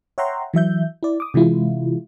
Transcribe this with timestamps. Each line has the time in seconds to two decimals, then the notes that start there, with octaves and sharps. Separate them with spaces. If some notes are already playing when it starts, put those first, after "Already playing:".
0.18 C#5 E5 F#5 G5 A#5 C6
0.54 E3 F#3 E5 G6
1.03 E4 D5
1.20 D6 D#6
1.34 C3 E3 G#3 E4 F4